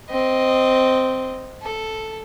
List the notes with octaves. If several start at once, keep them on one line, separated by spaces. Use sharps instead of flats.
C4 D#5
A4